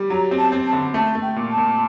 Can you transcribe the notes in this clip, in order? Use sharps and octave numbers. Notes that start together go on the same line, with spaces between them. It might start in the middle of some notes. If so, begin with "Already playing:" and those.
Already playing: G3
F#3 A#5
C4
A5
C4
A5
D3
A3 A5
A3
G5
A#2
A5
A#2